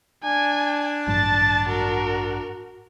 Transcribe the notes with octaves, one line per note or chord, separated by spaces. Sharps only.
D4 G#5
A1 G2 F#3 A5 A6
F#4 A#4